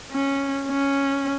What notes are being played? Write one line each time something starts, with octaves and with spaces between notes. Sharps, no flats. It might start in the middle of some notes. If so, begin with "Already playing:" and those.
C#4
C#4